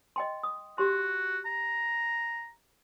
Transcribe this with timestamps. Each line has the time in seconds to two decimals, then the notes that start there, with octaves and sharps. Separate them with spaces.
0.16 D#5 G5 C6
0.43 D#6
0.78 F#4 G4 C6
1.46 A#5